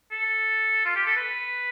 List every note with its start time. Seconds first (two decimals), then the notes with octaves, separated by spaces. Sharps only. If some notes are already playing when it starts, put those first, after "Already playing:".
0.12 A4
0.85 F4
0.96 G4
1.06 A4
1.16 B4